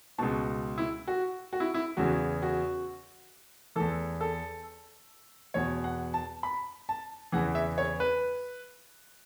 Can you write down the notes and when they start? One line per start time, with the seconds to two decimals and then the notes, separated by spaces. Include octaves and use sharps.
0.18 C#2 B2 A5
0.78 E4
1.08 F#4
1.53 F#4
1.60 E4
1.74 E4
1.97 E2 C#3 E3 F#4
2.42 F#4
3.76 E2 E3 A4
4.21 A4
5.54 E2 B2 C#5
5.84 F#5
6.14 A5
6.43 B5
6.89 A5
7.32 E2 C#3 E3 F#5
7.55 E5
7.78 C#5
8.00 B4